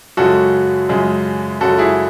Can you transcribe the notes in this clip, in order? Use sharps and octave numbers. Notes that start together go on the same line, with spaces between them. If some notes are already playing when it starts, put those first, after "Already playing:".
F#2 C#3 G#3 F#4 A4
F#2 C#3 G#3
F#2 C#3 G#3 F#4 A4
E4 G#4